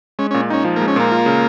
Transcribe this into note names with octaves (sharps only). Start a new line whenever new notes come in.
G#3 C#4
A#2 C#4
C#4 D#4
F3
G#3 A#3
C#4
A#2 A#3
F4
C#3